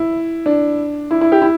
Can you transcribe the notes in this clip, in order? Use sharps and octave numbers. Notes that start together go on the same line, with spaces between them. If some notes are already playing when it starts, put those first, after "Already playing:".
Already playing: E4
D4
E4
E4
G4
E4